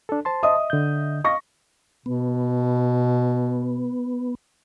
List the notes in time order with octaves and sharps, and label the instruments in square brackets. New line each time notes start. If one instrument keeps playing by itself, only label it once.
[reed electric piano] D4 A4
C5 A5 C6
[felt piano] D#5 E5 D#6
[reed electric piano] D3 G6
[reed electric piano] D#5 F5 [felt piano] C#6 A#6
[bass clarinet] B2 [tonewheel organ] B3